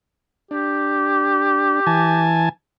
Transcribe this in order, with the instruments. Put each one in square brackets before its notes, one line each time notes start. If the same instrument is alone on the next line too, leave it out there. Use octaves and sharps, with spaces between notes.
[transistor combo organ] D4 [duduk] G4
[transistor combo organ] E3 G#5 A5